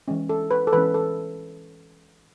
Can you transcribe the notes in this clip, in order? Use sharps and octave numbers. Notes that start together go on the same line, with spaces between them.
E3 G#3 C#4
A4
B4
A4
E3 G#3 C#4 B4
A4